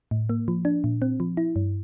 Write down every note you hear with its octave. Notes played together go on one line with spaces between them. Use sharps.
A2
A#3
F3
D4
A#2
C4
F3
E4
G2